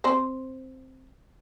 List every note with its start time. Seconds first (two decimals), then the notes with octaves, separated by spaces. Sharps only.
0.04 C4 C5